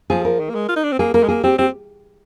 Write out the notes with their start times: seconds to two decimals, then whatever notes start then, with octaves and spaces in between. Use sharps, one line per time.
0.10 F3 G#4
0.25 A#4
0.39 D#3
0.50 A#3
0.55 G#3
0.69 F4
0.76 D#4
0.84 D4
0.92 C4
0.99 A#3 G#4
1.14 A#3 A#4
1.23 G#3
1.28 A#3 G#4
1.44 C4 G4
1.58 C4 G4